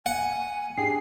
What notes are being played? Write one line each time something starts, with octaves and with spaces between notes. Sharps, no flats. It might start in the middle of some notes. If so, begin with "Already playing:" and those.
F#5 G#5
D4 G4 G#4 C7